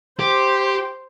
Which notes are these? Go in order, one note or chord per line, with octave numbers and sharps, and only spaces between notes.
G4 C5